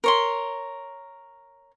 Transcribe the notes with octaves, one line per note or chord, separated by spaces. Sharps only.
A#4 C#5 C6